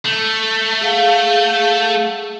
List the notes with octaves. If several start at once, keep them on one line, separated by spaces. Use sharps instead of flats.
A3
G#4 F5 F#5